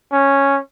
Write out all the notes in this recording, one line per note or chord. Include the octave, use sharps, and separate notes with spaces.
C#4